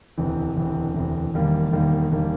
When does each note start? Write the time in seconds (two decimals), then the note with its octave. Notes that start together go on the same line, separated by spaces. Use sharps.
0.18 E1 D2 C3 E3
0.57 E1 D2 C3 E3
0.94 E1 D2 C3 E3
1.34 E1 D#2 D#3 G3 A#3
1.72 E1 D#2 D#3 G3 A#3
2.12 E1 D#3 G3 A#3